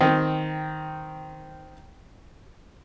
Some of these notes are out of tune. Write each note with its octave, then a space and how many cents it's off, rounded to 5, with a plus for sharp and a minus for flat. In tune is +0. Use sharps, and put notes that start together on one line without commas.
D#3 +0 C4 -10